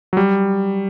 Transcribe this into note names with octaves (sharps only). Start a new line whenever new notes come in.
F#3
G3